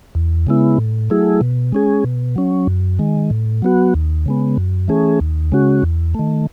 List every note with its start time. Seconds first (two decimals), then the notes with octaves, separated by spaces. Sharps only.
0.15 E2
0.47 C#3 G#3 B3 E4
0.78 A2
1.10 F#3 A3 E4 G#4
1.41 B2
1.72 G#3 C#4 G#4
2.04 B2
2.36 F#3 C#4
2.67 F#2
2.99 D#3 G#3
3.30 A2
3.62 F#3 B3 F#4
3.94 D#2
4.26 C#3 G#3 B3
4.57 F#2
4.88 E3 A3 C#4 G#4
5.20 D#2
5.52 C#3 G#3 C#4 F#4
5.83 E2
6.14 D#3 A3